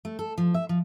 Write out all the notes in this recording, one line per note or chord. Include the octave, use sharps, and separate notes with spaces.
A3
A4
F3
E5
F3